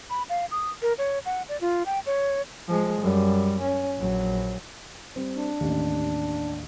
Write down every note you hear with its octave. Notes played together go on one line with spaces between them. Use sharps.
B5
F5
D#6
A#4
C#5
F#5
D5
F4
G5
C#5
F3 G#3
F#2 G3
C#4
A#1 F#3
G3 C4
D4
A1 D#2